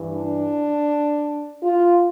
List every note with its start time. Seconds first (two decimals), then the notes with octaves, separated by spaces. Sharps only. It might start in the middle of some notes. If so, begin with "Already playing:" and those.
Already playing: G2 E3
0.15 D4
1.63 F4